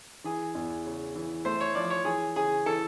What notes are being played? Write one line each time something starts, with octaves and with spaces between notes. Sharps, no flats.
E3 G#4
E2
C#3
E3
A3 C5
C#5
F3 D5
C#5
E3 G#4
C#3 G#4
E3 A4